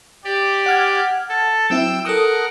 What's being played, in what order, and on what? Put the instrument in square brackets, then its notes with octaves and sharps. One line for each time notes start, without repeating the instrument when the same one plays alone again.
[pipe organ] G4 D5
[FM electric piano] F#5 F6 G#6
[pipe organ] A4
[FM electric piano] F#3 C4 E4 [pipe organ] G5 E6
[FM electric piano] A4 D#6 [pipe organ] A#4 F#5